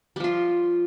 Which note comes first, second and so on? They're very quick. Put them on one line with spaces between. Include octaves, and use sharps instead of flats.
G3 F3 F4